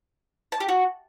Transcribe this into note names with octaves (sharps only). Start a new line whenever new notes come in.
A5
G4
F#4